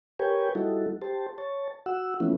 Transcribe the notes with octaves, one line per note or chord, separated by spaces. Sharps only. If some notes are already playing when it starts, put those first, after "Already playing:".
G4 A#4 B4 C#5 G5 G#5
G3 D#4 E4 F#4 A4
G4 C5 A5
C#5 A5
F#4 F#5 E6
E3 F3 A3 B3 C#4 E4